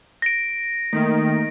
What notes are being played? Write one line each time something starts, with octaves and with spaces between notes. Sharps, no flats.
A#6 D7
D#3 A3 A#3